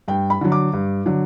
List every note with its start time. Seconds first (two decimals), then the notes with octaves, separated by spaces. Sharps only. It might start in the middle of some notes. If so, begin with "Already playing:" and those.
0.08 G2 G5
0.30 B5
0.41 D3 F#3
0.52 D6
0.73 G2
1.06 D3 F#3